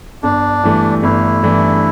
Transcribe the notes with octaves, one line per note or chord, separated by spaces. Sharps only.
G1 D4
G2 E3 A3
G1 E4
G2 E3 A3